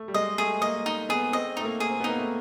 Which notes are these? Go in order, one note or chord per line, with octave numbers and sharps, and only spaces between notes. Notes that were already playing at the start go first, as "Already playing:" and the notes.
Already playing: A3
G3
G#3 D#5
A3 G#4
A#3 D#5
D#4
B3 G#4
C4 D#5
A3 D#4
A#3
G#4
C4
B3 D#4
A#3
A3